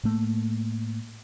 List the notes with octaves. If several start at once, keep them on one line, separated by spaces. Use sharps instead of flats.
A2 A3 A#3